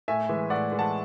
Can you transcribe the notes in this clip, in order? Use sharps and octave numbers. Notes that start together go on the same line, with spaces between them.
A2 E5 G#5
E3 G#3
A2 D5 F#5
E3 G#3
F#5 A5